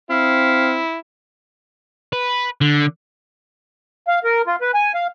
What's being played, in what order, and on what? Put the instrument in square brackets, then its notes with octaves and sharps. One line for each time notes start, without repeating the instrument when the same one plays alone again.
[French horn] C4 [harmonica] E4 [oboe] F5
[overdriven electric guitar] B4
D3
[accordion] F5
A#4
F4
B4
G#5
F5